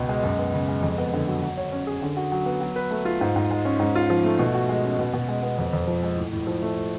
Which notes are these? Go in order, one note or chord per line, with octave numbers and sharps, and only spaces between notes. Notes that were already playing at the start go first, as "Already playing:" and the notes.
Already playing: C#2 B2
G#3
F#2
B3
C#3
G#3
F2
B3
D3
F#3
F#3
C#5
C#4
G#4
D3
F#4
F#3
B3
F#3
B4
A3
F4
G#2
G#2
G#3
C#4
G#2
F4
F3
A3
B2
F#4
G#3
C#4
B2
B2
G#3
B3
F2
F2
F3
G#3
A2
A2
F3
A3